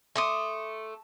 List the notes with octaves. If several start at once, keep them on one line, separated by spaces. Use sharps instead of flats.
A3 C6 D6 D#6